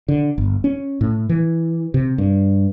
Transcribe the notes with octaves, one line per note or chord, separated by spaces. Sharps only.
D3
G1
C#4
A2
E3
C3
G2